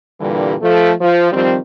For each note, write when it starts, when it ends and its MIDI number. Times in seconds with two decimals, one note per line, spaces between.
0.21 0.55 43
0.21 0.55 46
0.21 0.55 50
0.21 0.55 52
0.21 0.55 55
0.62 0.92 53
0.62 0.92 57
1.01 1.30 53
1.32 1.57 51
1.32 1.57 53
1.32 1.57 55
1.32 1.57 60